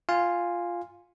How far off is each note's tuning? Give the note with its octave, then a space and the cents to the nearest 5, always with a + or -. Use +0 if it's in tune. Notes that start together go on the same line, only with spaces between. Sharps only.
F4 +0 F5 +0 G#5 -15